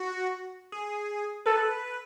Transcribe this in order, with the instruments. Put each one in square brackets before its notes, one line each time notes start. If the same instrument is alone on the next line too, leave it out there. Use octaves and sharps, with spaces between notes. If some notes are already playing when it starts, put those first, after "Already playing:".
Already playing: [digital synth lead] F#4
G#4
[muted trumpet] A4 [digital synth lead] B4